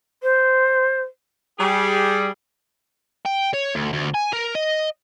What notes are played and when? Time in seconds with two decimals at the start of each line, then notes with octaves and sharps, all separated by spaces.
0.23 C5
1.59 G3 G#4
3.25 G5
3.53 C#5
3.75 D2
3.93 D2
4.14 G#5
4.33 A#4
4.55 D#5